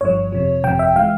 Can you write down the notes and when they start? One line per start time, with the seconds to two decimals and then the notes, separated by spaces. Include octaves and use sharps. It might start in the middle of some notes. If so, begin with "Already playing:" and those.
0.01 G1 G2 F3 C#5
0.32 F2 C3 F3
0.64 G1 F2 C3 F3 G5
0.79 E5
0.96 E3 G#3 F5